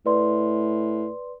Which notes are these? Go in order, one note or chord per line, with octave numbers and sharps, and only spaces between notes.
A2 B4 D5 C6